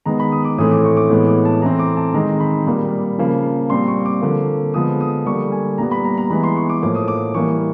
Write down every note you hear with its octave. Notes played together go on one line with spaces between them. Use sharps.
D#3 G#3 B3 A#5
B5
D#6
D6
A2 E3 A3 C4 D#6
D6
C#6
D6
A2 E3 G#3 B3
D6
A5
E3 A3 C4 A#5
D6
A5
D#3 G#3 C4 A#5
B5
A#2 G3 A#3
C#3 F3 A#3
A#2 G3 C4 C6
C#6
D6
D3 F3 A#3
D3 F3 G#3 B3 D#6
D#6
D3 G3 A#3 C#6
G#5
A#2 G3 B3 A#5
B5
A#5
A#5
E3 G#3 B3 B5
C6
C#6
D6
A2 F3 A#3 D6
D#6
D6
E3 G3 A#3 C#6